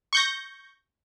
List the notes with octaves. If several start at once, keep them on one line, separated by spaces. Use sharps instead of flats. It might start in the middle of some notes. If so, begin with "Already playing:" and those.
C#6 G6 A#6